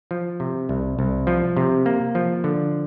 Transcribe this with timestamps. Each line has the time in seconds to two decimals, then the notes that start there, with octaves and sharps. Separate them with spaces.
0.11 F3
0.40 C3
0.69 C2
0.99 C2
1.27 F3
1.57 C3
1.86 A#3
2.15 F3
2.44 D3